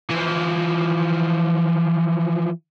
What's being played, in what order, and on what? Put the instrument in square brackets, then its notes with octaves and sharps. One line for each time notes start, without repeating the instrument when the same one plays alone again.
[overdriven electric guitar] E3 F3